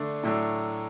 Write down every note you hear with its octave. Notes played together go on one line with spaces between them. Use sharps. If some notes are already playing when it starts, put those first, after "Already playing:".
Already playing: D3 A3 D4
A2 F#3 A3 D4